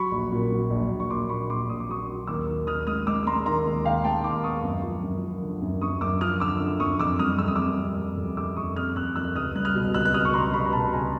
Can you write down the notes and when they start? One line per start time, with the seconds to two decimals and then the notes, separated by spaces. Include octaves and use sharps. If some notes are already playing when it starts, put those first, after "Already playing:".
Already playing: F#3 B5 C#6
0.12 A#1
0.32 A#2
0.52 F#3
0.70 A#1
0.90 A#1
1.00 C#6
1.10 A#1 C6 D6
1.29 A#2 B5 C#6
1.49 A#1 C6 D6
1.69 A#1 D#6
1.80 D6
1.89 F#3 C#6 D#6
2.09 F#3
2.27 D#2 D6 E6
2.48 D#3
2.67 D#2 D#6 F6
2.87 G#3 D#6 F6
3.07 G#3 D6 E6
3.27 G#3 A#5 C6
3.46 D#3 A#5 C6
3.65 D#2
3.85 D#2 F5 G5
4.04 G#3 G5 A5
4.24 D#2 C6 D6
4.44 B3 C#6 D#6
4.63 F#2
4.83 F3
5.03 F#2
5.23 F3
5.42 D3
5.62 F#2
5.82 F#2 C#6 D#6
6.01 F#2 D6 E6
6.21 F3 D#6 F6
6.40 D3 D6 E6
6.60 D3
6.80 F#2 C#6 D#6
6.99 F2 D6 E6
7.19 G3 D#6 F6
7.39 F2 E6
7.48 D#6
7.56 G3 D6 E6
7.79 F2
7.98 F2
8.17 F2
8.37 F2 D6 E6
8.56 F2 C#6 D#6
8.76 F2 D#6 F6
8.96 F2 E6 F#6
9.16 F2 E6 F#6
9.35 C#2 D#6 F6
9.55 G3 F#6
9.65 D#6 F6
9.75 B2
9.94 C#2 E6 F#6
10.05 F#6
10.14 B2 D#6 F6
10.25 C#6
10.34 G3 A#5 C6
10.54 B2 B5 C#6
10.65 A#5
10.73 B2 A5 B5
10.93 C#2 G#5 A#5